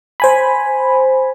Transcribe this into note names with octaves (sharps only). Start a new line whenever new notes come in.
C5 G#5 B5